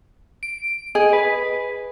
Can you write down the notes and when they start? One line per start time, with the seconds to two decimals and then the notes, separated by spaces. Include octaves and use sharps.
0.43 D7
0.95 G#4 D#5
1.13 B4